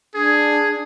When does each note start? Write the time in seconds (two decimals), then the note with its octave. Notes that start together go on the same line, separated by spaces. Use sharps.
0.15 D4 G#4